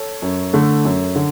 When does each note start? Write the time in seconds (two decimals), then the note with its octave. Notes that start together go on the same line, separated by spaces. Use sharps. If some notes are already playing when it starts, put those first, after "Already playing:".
Already playing: A4 C#5
0.22 F#2
0.53 D3 A3
0.85 F#2
1.15 D3